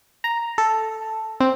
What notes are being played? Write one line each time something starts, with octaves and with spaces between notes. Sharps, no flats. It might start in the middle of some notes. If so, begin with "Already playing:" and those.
A#5
A4
C4